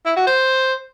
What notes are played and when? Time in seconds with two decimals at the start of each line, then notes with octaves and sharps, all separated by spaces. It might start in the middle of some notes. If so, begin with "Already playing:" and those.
0.06 E4
0.16 F#4
0.27 C5